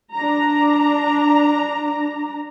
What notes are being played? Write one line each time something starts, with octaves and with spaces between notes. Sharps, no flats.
D4 A#5